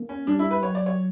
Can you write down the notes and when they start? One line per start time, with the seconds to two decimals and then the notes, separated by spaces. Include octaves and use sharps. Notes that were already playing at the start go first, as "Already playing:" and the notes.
Already playing: A#3
0.09 C#4
0.27 G3 D4
0.39 E4
0.51 B4
0.63 F#3 C#5
0.75 D5
0.86 C#5